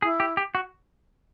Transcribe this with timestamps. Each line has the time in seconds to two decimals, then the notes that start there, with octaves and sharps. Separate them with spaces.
0.02 E4 G#4
0.20 G4
0.37 G4
0.55 F#4